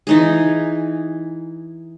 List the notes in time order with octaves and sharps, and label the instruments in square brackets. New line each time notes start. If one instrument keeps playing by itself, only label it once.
[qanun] E3 D#4 G#4